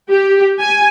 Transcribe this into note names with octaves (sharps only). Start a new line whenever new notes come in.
G4
G#5